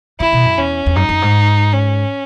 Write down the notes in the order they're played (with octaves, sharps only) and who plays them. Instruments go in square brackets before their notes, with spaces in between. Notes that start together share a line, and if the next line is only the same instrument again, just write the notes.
[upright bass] D#3 [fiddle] E4
[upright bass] B2
F#2
[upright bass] E2 [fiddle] C#4
[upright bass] E2
[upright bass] F#2 [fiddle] D#4
[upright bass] F#2
G#2
[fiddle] C#4